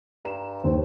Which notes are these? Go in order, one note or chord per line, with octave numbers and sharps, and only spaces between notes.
G2 A#5 E7
D#2 C4